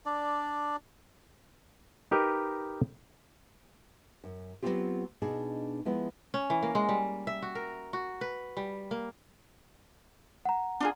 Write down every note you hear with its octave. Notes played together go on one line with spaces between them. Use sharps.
D4 D5
D#4 G4 A#4 B4 D#5
F#2
F#3 A3 B3 C4 F4 G4
B2 D4 D#4 G#4
F3 G#3 B3 E4
C#4
E3
A#3
G#3
G3
E5
F#4
A#4
F#4
B4
G3
A#3
F#5 A#5
D4 F4 G#4